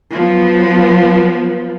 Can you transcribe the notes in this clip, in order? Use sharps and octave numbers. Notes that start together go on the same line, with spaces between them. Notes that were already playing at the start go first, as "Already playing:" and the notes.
F3 F#3 B3